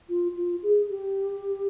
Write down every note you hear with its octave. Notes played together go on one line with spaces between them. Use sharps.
F4
F4
G#4
G4